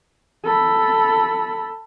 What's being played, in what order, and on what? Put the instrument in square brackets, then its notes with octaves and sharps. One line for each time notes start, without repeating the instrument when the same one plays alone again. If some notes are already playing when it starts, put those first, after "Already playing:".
[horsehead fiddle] A4 B5